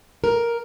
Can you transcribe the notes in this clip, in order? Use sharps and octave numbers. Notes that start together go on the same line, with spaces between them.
A#4